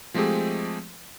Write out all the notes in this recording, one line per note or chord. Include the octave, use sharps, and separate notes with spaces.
F3 G#3 A3 C4 G4 G#4